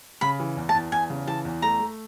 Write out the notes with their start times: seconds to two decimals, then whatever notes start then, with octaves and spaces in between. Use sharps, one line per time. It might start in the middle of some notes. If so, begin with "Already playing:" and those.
0.21 C#3 B5
0.39 E3
0.57 E2
0.69 A5
0.74 E2
0.92 E2 G#5
1.10 C#3
1.27 E3 A5
1.45 E2
1.62 A3 A#5
1.80 A3